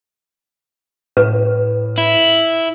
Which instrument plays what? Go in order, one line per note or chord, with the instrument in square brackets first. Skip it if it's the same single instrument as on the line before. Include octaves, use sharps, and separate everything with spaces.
[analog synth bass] A2 [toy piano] B4
[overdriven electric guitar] E4